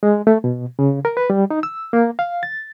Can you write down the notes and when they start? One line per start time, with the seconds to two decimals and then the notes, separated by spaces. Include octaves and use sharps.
0.03 G#3
0.27 A3
0.44 B2
0.79 C#3
1.05 A#4
1.17 B4
1.30 G3
1.50 D#4
1.63 E6
1.93 A#3
2.19 F5
2.43 A6